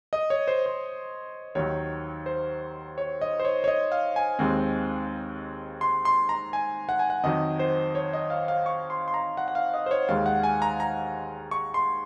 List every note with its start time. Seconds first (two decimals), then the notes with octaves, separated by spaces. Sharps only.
0.13 D#5
0.30 C#5
0.48 C5
0.66 C5
1.55 D#2 D#3 F#3 C#5
2.26 C5
2.98 C#5
3.21 D#5
3.40 C5
3.45 C#5
3.64 C#5
3.68 D#5
3.92 F5
4.16 G#5
4.39 D#2 D#3 G#3 C4
5.81 C6
6.05 C6
6.29 A#5
6.53 G#5
6.89 F#5
6.99 G#5
7.10 F#5
7.23 F2 D#3 F#3 D#5
7.59 C5
7.95 C#5
8.13 D#5
8.30 F5
8.48 F5
8.66 C#6
8.90 C6
9.08 C6
9.14 A#5
9.37 F#5
9.48 F#5
9.55 F5
9.74 D#5
9.86 C5
9.91 C#5
10.09 D#2 D#3 G#3 F5
10.26 F#5
10.44 G#5
10.62 A#5
10.80 A#5
11.51 C#6
11.74 C6